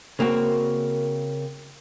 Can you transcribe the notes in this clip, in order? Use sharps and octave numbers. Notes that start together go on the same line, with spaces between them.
C#3 A#3 C4 F#4